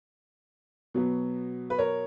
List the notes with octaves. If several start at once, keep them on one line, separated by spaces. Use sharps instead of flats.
B2 F#3 B3
B4
A#4 C#5